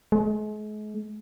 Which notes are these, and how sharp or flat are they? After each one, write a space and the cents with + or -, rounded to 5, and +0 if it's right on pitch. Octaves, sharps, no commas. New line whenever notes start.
G#3 +40